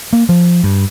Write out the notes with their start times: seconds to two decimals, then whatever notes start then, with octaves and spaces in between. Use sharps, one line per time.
0.13 A#3
0.29 F3
0.63 G2